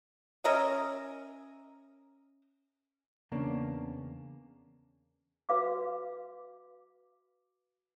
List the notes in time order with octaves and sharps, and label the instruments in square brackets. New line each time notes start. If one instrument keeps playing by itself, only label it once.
[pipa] C#4 A#4 D#5 E5
[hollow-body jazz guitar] E2 C#3 A#3 D4
[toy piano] F#4 B4 F5 D6